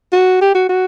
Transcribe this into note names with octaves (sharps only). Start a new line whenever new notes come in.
F#4
G4
F#4
F#4